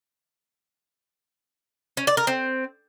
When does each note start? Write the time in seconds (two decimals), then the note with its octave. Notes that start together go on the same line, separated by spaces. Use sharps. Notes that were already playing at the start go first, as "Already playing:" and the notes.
1.97 C#4
2.07 D5
2.17 A#4
2.27 C4